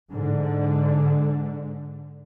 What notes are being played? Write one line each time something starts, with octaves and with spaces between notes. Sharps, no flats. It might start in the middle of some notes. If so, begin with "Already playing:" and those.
G#2 D3